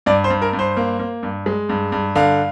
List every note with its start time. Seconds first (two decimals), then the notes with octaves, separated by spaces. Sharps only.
0.06 G2 D5
0.24 C5
0.30 G2
0.42 A#4
0.53 G2
0.59 C5
0.77 A#3
0.99 A#3
1.23 G2
1.46 G#3
1.69 G2
1.92 G2
2.16 D3 F5